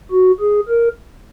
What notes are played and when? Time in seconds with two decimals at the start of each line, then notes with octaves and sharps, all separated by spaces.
0.12 F#4
0.40 G#4
0.69 A#4